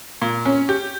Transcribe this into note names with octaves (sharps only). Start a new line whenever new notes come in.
A#2
C#4
G4